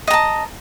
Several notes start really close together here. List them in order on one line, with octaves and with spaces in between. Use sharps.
D#5 A#5 A5